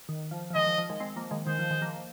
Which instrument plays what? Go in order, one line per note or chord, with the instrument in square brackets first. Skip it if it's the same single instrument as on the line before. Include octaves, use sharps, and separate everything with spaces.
[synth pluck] D#3
F3
F3
[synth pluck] D#3 G#3 [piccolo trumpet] D#5
[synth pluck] F3
F3
D#3 G#3
G#3 C4
F3 A#3
D#3 G#3
[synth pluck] D#3 G#3 [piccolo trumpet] C5
[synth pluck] F3
D#3 G#3
F3 A#3